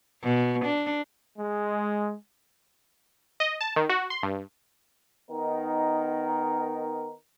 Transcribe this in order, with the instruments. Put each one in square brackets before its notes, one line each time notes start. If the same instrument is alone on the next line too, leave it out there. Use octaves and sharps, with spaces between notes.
[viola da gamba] B2
D4
[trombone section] G#3
[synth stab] D#5
A5
D#3
F#4
C6
G2
[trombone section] D#3 B3 D#4 A#4